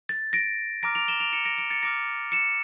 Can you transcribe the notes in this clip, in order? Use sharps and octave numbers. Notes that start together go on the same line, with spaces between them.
A6
A#6 D7
A#5 D6 F6 A#6 D7
D7 F7
E7 G7
D7 F7
C#7 E7
A#6 D7
A#6 D7
A6 C#7
A#5 D6 F6 A#6 D7
C#7 E7